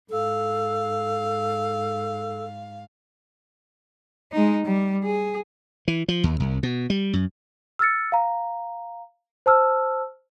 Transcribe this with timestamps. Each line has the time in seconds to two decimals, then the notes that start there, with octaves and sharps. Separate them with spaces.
0.10 G#2 A4 F5
4.32 G#3 D#4
4.66 G3
5.04 G#4
5.88 E3
6.08 F3
6.24 D#2
6.40 C2
6.63 B2
6.90 G3
7.13 F#2
7.79 E6 F6 A6 C#7
8.12 F5 A#5
9.46 C5 A5 E6 F6